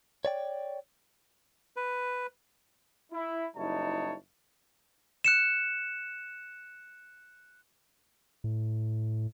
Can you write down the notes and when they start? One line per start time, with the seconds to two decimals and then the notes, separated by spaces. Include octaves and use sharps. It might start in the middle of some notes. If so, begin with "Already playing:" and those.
0.25 C#5 D5 G5
1.76 B4
3.12 E4
3.57 F#1 G3 D#4 E4 C#5 A5
5.24 F#6 C#7 E7
8.44 A2